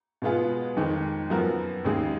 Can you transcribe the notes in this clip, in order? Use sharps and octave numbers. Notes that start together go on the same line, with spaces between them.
B2 G#3 B3 F4 G#4
F2 D#3 G#3
F#2 F3 B3 F#4 A#4
D#2 C#3 G#3 D#4 G#4